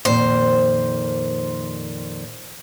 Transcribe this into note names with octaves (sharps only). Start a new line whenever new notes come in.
F2 A#2 D#3 C5